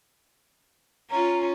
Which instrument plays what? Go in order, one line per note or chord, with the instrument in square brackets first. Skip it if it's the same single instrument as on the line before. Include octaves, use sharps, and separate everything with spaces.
[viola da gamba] C#4 F4 [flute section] A#5